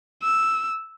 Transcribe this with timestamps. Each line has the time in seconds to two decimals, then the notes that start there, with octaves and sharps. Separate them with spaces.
0.23 E6